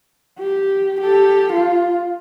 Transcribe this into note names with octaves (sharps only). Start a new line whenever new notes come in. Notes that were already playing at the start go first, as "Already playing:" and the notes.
G4
G4 A4
F4